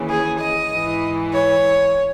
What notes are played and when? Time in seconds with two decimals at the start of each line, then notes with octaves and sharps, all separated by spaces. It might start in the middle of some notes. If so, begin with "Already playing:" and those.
Already playing: D#2 C#3 E3
0.10 G#4
0.41 D#5
0.71 G#2 E3
1.33 C#5